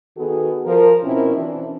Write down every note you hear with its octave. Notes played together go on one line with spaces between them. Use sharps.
D#3 B3 F#4 G#4 A4
F3 A#4
B2 C4 C#4 E4 A#4
E3 D4